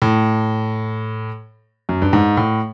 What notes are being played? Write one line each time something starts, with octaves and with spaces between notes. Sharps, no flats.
A2
F#2
G2
G#2
A2